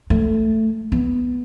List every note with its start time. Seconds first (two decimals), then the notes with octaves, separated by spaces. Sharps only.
0.10 A3
0.92 B3